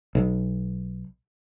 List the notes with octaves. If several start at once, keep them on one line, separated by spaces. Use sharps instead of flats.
B1